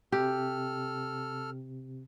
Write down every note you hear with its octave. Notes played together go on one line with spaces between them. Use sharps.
C3 G4 A4 F6